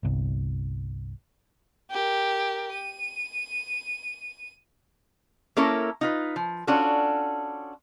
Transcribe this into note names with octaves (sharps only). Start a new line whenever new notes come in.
G1 C2
G4 A#4
D#7
A#3 C#4 E4 A4 A#4 C#5
D#4 F4 B4
F3
C#4 D4 F4 F#4 A4